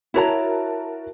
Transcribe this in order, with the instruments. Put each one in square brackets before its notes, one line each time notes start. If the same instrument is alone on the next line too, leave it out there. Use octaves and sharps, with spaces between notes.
[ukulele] E4 C#5 A#5 [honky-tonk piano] F#4 A#4 A5